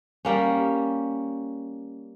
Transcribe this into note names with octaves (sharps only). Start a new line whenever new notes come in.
G3 A#3 C#4